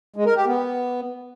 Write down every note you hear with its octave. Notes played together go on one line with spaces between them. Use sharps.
G#3
A#4
G4
B3